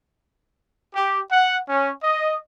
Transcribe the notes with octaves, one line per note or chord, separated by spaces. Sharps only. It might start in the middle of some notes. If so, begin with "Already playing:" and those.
G4
F#5
C#4
D#5